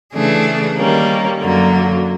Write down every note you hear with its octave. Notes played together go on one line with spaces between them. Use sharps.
C#3 E3 A3 D4 G#4
D#3 G3 A#3 C#4
F#2 D3 F#3 A#3